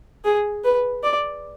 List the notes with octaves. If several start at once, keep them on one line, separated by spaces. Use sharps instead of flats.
G#4
B4
D5